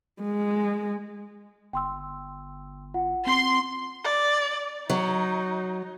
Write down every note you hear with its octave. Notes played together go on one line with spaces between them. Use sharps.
G#3
G1 G5 C6 E6
F4 F#5
C4 C6
D5
F#3 D#4